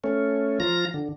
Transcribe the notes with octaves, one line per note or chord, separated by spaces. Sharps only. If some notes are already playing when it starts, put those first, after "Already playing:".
A3 C#4
F3 F4 A#5 A#6
D3